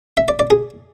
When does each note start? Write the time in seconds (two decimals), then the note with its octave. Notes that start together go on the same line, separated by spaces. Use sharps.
0.17 E5
0.28 D5
0.39 D5
0.50 G#4